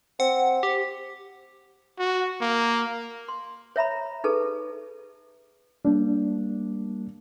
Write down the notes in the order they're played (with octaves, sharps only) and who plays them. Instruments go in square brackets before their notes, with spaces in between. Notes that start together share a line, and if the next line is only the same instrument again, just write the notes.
[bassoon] C4 [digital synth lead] F#5
[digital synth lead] G4
[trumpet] F#4
A#3
[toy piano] C6
C#5 E5 A#5 B5
D#4 G#4 A4 B4 A5
[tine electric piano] G3 A#3 [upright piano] D4